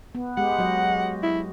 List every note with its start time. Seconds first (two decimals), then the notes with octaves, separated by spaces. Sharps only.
0.15 B3
0.37 G#3 G4 F#5
0.58 F#3 F#4 D#5
1.23 E4